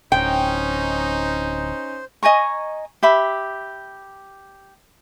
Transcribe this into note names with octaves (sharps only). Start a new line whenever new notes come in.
D1 C#4 D#4 C5 G5
D#5 G#5 A#5 C#6
G4 E5 B5